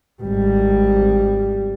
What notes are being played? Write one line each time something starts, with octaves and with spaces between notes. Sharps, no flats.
G#1 G3